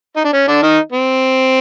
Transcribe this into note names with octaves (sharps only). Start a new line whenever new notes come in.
D#4
D4
C#4
D3 D4
D#3 D#4
C4